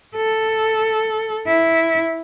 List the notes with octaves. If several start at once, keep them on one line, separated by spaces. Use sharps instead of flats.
A4
E4